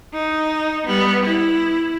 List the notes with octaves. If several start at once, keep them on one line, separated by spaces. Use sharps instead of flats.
D#4
G3 B3
E4